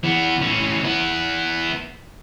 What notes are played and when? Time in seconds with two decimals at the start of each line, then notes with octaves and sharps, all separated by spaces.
0.04 E3 B3
0.41 E3 C#4
0.84 B3 E4